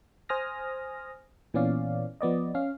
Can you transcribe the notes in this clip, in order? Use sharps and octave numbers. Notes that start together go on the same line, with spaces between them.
C5 G#5 D#6 F6 A#6
A#2 E3 B3 C#4 D5 F5
F3 B3 D5 D#5
C#4 F5